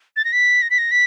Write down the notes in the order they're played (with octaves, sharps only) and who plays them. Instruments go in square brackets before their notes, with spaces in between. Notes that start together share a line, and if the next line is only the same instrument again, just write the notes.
[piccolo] A6
A#6
B6
A#6
B6
A#6
B6